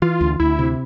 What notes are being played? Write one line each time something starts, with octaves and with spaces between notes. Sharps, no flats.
E3 F4
D2
D2 E4
C3